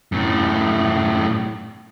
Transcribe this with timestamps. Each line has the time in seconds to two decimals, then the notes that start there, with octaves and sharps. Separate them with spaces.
0.12 F#2 A2